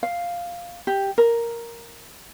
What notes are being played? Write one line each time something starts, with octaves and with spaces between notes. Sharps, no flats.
F5
G4
A#4